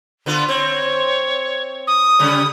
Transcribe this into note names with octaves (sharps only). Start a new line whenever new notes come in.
D3 B3 F4
C4 C#5
D#6
C#3 G3 C#4